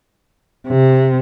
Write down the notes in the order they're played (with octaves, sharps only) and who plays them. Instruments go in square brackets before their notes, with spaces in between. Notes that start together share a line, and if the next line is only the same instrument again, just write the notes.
[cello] C3